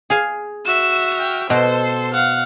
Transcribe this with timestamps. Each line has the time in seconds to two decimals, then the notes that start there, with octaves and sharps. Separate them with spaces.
0.10 G#4 F5 G#5
0.65 F#4 E5 E7
1.15 G5 F6
1.50 B2 A4 C5 C6
2.14 F5 F#5